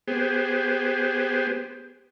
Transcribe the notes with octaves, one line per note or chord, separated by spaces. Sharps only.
B3 G4 G#4 C5